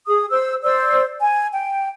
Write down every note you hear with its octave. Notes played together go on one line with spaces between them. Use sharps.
G#4 D#6
C5 E6
C5 D5 E6
G#5
G5